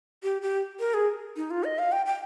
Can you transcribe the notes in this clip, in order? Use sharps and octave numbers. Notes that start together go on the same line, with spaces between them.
G4
G4
A#4
G#4
D#4
F4
D#5
F5
G5
G5